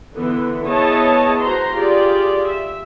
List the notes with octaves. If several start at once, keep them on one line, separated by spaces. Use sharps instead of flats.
D3 E3 B3
B3 E4 G#4 C#5 D#5 A5
F#4 C5 A#5 C6
F4 G4 G#4 D5
E5